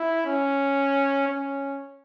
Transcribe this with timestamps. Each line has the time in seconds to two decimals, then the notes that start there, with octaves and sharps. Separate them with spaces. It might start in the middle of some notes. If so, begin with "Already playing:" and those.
Already playing: E4
0.26 C#4
1.28 C#4